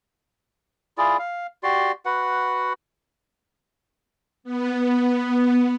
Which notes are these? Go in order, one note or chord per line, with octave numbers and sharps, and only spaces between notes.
E4 F4 G#4 D5
F5
F#4 G4 D5 C6
F#4 B4 F#5
B3